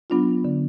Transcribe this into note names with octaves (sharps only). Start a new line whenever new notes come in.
F#3 B3 D4 F4
D3